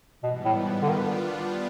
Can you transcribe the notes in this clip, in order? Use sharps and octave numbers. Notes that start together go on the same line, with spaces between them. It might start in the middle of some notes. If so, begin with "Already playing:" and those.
G#2 B2 E3 G3 B3
A2
G3 B3 D4 F4
D3
D#3